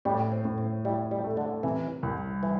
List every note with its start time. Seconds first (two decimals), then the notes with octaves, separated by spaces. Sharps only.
0.05 A2 G3
0.32 C4
0.45 A2
0.58 C4
0.85 G3 E4
1.11 G3
1.24 A3
1.37 D3
1.63 C3 E3
2.03 C2
2.43 E3